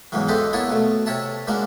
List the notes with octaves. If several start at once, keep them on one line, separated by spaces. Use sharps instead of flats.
E2 G#2 C#3 E3 F#3
G4 A4 B4 C5 D#5 E5
A#3 B3 E4 C#5 A5
B2 A3
C3 C#5 E5 A5
G#3 A#3 C#4 D4 F#4